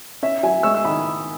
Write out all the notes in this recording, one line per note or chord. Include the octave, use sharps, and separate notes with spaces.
C#4 E5
F#3 E5 G#5
G#3 C#6 E6
E6
D#3 B5 D#6